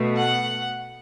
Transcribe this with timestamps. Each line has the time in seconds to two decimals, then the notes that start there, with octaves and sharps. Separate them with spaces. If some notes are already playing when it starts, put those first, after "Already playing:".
Already playing: B2 A3
0.17 F#5